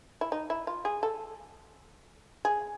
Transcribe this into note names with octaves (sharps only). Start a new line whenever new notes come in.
E4
D#4
E4
F4
G#4
A4
G#4